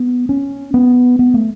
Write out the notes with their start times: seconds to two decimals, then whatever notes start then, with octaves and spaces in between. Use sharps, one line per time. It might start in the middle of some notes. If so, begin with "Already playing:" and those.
Already playing: B3
0.29 C#4
0.74 B3
1.19 B3
1.34 A3